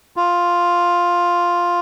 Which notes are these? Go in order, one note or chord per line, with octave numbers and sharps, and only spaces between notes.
F4